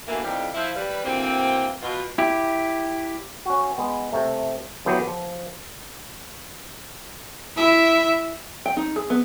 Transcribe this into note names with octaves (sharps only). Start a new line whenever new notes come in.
B2 D3 E3 A3 A#3
F2 A2 F3 G3 D#4 G4
F3 E4
G3 B4
D2 E3 A#3 C4
B2 F4
E4 G4
C#4 F#4
G#3 B3
C3 A3
C#3 E3 F#3 B3 G4
F3
E4 E5
G5
D#4
G#4
B3